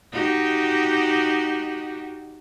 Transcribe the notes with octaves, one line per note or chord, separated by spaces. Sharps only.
D#4 F#4 G4